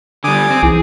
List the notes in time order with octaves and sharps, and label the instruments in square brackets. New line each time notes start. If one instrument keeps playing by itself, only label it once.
[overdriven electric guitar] D3 G3 [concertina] G#5 D6 D#6
[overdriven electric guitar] C4
[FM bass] C2 [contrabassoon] E3 [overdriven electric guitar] G#4